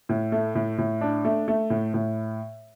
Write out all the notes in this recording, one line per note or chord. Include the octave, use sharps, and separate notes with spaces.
A2
A3
A2
A2
D4
A3
A3
A2
A2